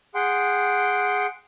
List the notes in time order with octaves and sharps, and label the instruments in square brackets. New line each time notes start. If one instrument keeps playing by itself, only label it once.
[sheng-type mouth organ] G#4 F#5 G5 C6